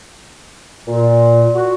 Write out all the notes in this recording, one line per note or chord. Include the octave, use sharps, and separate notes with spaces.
A#2
F#4